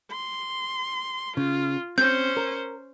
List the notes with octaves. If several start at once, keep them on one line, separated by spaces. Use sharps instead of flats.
C6
C#3 F4
C4 C#4 C5 G6
A#4